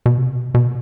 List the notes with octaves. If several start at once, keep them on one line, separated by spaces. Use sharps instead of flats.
B2
C3
B2
B2